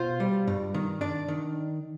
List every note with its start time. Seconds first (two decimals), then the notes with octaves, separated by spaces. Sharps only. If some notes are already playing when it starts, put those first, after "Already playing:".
Already playing: B2 F4 C5
0.20 G3
0.47 G2
0.74 D#3
1.01 D4 D5
1.28 D#3